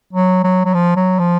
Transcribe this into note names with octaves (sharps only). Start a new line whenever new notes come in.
F#3
F#3
F#3
F3
F#3
F3